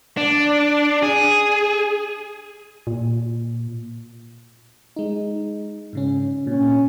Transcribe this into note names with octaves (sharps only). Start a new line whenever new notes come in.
D4
G#4
A#2
G#3 D#4
G#2 C#3 C#4
A#2 C#4